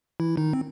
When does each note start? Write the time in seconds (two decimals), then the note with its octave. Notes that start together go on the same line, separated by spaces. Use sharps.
0.20 E3 E4
0.37 D#3 D#4
0.53 C4